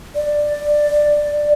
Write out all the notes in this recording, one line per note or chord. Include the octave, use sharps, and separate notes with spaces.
D5